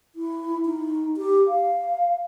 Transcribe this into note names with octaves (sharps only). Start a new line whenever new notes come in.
E4
D#4
G4
F5